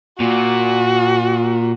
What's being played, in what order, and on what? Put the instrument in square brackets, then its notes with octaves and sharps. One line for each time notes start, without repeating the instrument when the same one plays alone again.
[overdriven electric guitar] A#2 [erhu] F#4